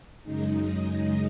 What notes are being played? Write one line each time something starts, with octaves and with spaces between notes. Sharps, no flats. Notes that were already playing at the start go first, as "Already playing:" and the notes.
F#2 C#3 G#3 D#4
D#5